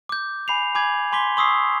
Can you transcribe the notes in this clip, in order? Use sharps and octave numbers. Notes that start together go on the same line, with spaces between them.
D6 G6
G#5 B5 C7 F7
G#5 B5 D6 G6 G#6 F#7
G#5 C6 D6 B6 G7
C6 C#6 D#6 E6 B6 C7